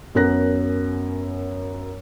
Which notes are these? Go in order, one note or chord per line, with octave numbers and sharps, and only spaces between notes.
F#2 B3 C#4 A#4 F#6 A#6